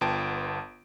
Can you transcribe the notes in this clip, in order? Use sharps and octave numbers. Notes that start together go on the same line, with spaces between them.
G1 B3 F4 G5 A5 D7